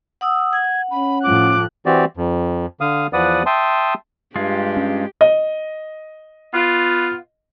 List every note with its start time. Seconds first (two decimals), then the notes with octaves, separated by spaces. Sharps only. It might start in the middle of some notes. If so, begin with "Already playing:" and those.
0.21 F#5 D#6 E6
0.53 F#5 G#6
0.91 C#4 B5
1.23 A2 F3 D6 F#6
1.86 E3 C4 F#4 G4 D5
2.17 F2
2.81 D3 F5 D#6
3.13 E2 F3 B4 D5 F#5 D#6
3.46 E5 G5 A5 C6 D#6
4.36 G2 G#3 F4 G4
4.77 C#4
5.21 D#5
6.54 B3 F4